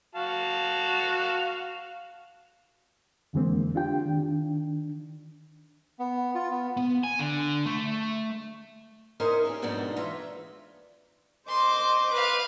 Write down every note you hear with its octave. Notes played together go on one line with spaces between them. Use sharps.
F#4 F5 A5
F2 D3 E3 G#3 A#3 C4
D4 F4 G4 G5
D#3 D4
B3
F4
B3
B3
G#5
D3
A3
D#4 E4 G#4 A#4 C5 D#5
C#4 G4 G#4
F2 G#2 B2 F#3 D4 D#4
E3 G#3 F4 C5 E5
C5 D#5 C6 D6
B4 F5